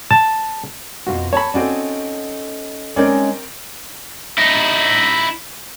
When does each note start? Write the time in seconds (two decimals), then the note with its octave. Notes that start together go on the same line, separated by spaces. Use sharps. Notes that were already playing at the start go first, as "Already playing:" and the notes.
0.11 A5
1.07 F2 B2 F4 F#4
1.33 C#5 A5 B5
1.54 C4 C#4 D#4 F#4 A4 D5
2.96 G#3 C4 C#4 D#4 A#4 D5
4.38 D#4 E4